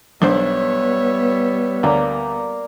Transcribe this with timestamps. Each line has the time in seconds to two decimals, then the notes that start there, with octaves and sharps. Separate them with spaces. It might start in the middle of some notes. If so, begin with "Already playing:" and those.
0.22 B1 G3 B3 D4 C5 C#5 E5
1.83 D2 A#3 D5 A#5